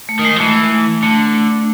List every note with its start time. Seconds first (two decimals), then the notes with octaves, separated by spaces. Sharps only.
0.09 A3
0.19 D#3
0.25 G#3
0.36 F3
0.40 E3 A3
1.02 D3 A3